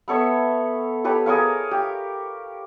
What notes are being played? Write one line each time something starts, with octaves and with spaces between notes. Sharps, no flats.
B3 A4 C#5 E5
G4 A4 B4 C#5
G#4 A#4 C#5 F5
G4